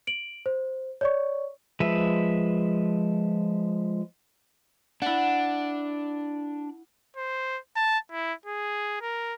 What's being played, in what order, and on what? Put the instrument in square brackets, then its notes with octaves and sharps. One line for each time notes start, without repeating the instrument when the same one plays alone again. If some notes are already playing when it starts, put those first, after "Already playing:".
[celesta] D7 F#7
C5
C#5 D5 C#6
[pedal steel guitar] F3 G#3 B4 E5
[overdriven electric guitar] D4 [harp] E4 F#5
[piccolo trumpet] C5
A5
E4
G#4
A#4